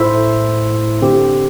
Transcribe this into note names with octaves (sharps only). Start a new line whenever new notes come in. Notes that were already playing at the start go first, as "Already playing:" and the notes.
Already playing: A2 A3 E4 C5 E5
D3 C4 G4